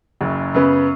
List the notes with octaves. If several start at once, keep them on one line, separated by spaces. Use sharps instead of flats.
F#1 F#2 C#3
F#2 C#3 B3